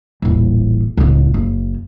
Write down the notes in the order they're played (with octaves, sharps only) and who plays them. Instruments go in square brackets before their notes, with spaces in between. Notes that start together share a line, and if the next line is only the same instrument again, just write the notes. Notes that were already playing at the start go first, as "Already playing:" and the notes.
[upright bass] D#1 A1
D1 C#2
F#1